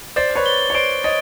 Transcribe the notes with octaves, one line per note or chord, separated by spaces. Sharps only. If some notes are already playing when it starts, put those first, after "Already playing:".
C5 D5 A6
B4 C#5
G7
C#5
C5 D5 D7
C#5 D#5 A6